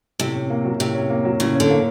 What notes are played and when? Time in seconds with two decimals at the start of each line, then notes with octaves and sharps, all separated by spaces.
0.19 A2 C3
0.35 C#4
0.50 A#3
0.65 F#3
0.80 A2 C3
0.95 C#4
1.10 A#3
1.25 F#3
1.40 A2 C#3
1.55 D3 C#4
1.70 A#3